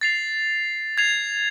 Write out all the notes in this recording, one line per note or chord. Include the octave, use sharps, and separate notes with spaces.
A6 C7 F7
G#6 C7 F7